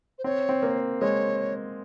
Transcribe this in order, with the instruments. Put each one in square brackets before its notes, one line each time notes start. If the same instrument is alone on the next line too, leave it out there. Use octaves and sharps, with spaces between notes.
[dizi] C5
[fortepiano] C4 [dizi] C#5
[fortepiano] C4
A#3
[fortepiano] G#3 [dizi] C#5